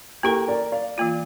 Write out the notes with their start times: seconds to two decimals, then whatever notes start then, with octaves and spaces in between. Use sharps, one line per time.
0.23 A#3 E4 G4 A4 A#4
0.48 A#4 D5
0.72 D5 F5
0.98 E3 A#3 F4